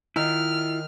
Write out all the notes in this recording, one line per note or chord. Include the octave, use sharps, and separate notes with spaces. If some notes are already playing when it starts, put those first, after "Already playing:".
D#3 E4 F4 F6